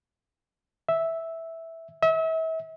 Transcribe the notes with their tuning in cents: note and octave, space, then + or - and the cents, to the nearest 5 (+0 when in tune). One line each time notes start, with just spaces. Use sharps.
E5 -5
E5 -35